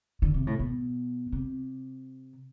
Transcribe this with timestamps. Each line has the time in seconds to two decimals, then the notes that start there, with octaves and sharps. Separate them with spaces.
0.22 D3
0.34 C3
0.47 A2
0.59 B2
1.32 C3